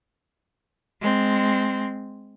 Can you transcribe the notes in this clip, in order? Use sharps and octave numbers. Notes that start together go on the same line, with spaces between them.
G#3 C4